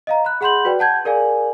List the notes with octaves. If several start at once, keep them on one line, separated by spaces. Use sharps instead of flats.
D#5 F5 A#5
B5 F#6
G#4 F#5 B5 C6 G6 F#7
F#4 B4 D5 G5
F#5 A5 G6 G#6
G#4 A#4 D5 F5 G#5